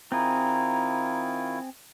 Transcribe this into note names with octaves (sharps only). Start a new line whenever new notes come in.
D#3 C4 E4 F4 G#4 A#5